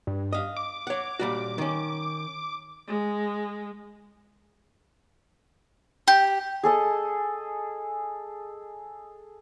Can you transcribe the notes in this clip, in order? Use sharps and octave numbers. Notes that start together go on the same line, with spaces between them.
G2
D#5 F5
D6
C#5 F#5
A#2 G3 F#4
D#3 C#4
G#3
G4
G#4 A4 D#5